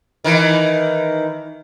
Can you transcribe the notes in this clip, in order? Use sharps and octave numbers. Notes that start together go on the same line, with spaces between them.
D#3 E3